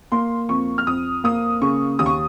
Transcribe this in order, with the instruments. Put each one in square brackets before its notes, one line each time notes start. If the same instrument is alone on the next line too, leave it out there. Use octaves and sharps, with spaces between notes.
[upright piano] A#3 C6
F2 C#6
F6
F2 D#6
A#3 D#6
C#3 C#6
D#2 D#6
C#6